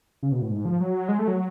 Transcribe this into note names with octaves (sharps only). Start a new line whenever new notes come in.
C#3
B2
A2
G#2
F3
F#3
G#3
A3
F#3